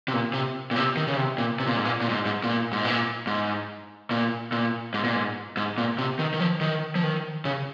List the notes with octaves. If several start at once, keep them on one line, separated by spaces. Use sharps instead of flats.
C3
A#2
C3
A#2
C3
D#3
C#3
C3
A#2
C3
A#2
G#2
A#2
A#2
G#2
G#2
A#2
G#2
A#2
G#2
A#2
A#2
G#2
A#2
G#2
G#2
A#2
C3
D#3
D#3
F3
D#3
F3
D#3
C#3